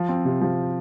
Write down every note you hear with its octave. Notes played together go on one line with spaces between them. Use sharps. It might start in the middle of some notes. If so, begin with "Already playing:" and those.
Already playing: F3
C4
C3
F3